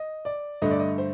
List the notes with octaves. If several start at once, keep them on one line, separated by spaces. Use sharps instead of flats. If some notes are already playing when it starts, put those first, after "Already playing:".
Already playing: D#5
D5
G2 D3 A3 D#5
D5
D#5
C5